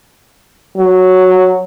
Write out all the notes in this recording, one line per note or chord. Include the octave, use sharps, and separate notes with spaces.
F#3